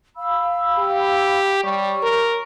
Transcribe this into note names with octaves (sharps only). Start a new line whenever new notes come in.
F5 B5 E6
G4
G3 G4 C#5 C#6
A#4